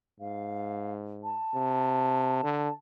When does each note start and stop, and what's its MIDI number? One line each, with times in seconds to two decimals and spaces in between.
0.20 1.39 44
0.20 0.92 77
1.23 2.73 81
1.54 2.42 48
2.43 2.69 50